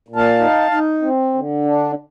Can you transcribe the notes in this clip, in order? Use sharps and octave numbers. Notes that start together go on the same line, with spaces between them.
A#2
F5 A5
D#4
D#4
C4
D3
D4